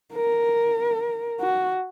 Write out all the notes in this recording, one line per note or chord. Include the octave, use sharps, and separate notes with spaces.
A#4
F#4